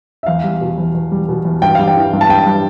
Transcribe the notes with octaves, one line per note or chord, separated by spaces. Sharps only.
E5
E2 F5
G3
B2
E2
E2
G3
B2
E2
G2 G5
G3 F5
G5
E3
G2
A5
G2 G5
G3